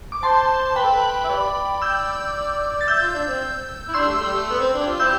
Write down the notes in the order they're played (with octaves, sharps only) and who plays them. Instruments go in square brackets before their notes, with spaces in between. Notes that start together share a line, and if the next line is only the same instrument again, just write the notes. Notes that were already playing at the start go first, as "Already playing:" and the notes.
[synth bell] D6
[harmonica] C5 [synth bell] A5 C6
[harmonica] B4 [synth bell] G5 B5
[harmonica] A4
B4
E5
G4 B4 D5
[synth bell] E6 G6
A6
[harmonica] E5 [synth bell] E6 G6
[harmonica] F4
D4
C4
E4
[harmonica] D4 [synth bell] C6 E6
[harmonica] G3
A3
G3
A3
B3
C4
D4
G4
F4
[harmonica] C4 E4 G4 [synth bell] E6 G6